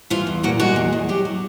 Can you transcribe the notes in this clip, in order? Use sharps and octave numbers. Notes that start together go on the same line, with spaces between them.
E3 F4
E2
A#2 F#4
G#3 F#4
E2
E2
F#3 G4
F#3